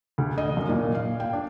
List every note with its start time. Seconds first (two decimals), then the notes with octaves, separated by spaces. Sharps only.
0.18 D2
0.38 D#5
0.57 F#2
0.69 A#2
0.95 F5
1.20 G5
1.33 D4